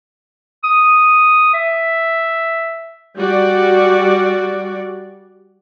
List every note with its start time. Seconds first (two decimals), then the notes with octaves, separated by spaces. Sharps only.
0.64 D#6
1.54 E5
3.18 G3 F#4 D5